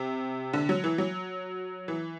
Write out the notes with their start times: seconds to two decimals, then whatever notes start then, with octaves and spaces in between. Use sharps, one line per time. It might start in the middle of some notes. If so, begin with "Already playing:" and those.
Already playing: C3
0.53 D3
0.69 F#3
0.84 E3
0.98 F#3
1.88 E3